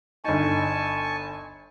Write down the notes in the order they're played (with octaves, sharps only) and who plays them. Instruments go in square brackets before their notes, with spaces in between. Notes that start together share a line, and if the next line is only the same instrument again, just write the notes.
[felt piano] G1 D#4 [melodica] G#5 A5 C#6